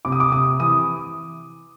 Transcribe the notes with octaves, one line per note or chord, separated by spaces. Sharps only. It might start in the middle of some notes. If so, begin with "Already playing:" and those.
C3 D6
D#6
D6
C3 D#6
E3 D#6